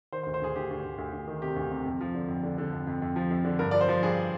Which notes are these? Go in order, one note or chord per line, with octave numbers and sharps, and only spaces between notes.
D#3 C5
C5
D2
C5
D2 G#4
D2 G4
D2
D2
D2
D2
D#3
C3 G4
D2
C3
F2
F3
D3
F2
D3
D3
F2
F2
F2
F3
F2
D3
G2 A#4
F3 D5
C5
F3
G2 G#4